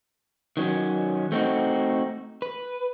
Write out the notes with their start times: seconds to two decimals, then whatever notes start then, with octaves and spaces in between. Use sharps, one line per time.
0.57 D#3 F#3 C#4
1.32 A3 C4 D#4 F#4
2.42 B4